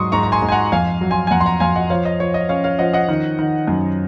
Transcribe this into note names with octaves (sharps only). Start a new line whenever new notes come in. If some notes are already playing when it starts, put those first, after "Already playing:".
Already playing: G#2 F#3 C6 C#6 D#6
G#2 A#5 C#6
A#5
G#5 C6
G#2
G#5
F#5 A#5
F2 F5 G#5
F#3
G#5 C6
G#5
F2 F#5 A#5
C6
F#5 A#5
F2 F5 G#5
D#5 F#5
F3 C#5 F5
D#5
F3 C#5
D#5
C#4 C#5 F5
C#5 F5
F3 D#5 F#5
D#5 F#5
D#3
D#3
F#2